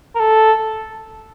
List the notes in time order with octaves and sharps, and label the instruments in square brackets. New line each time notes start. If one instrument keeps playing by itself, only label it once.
[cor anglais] A#4
A4